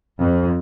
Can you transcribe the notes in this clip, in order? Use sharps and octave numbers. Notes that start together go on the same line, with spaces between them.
F2